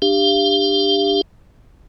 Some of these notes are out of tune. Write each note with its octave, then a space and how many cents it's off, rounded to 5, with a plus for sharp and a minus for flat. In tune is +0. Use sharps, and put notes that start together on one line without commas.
D4 +20 G4 +15 F5 -25